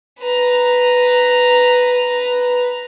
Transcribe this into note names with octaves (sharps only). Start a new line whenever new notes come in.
B4 A#5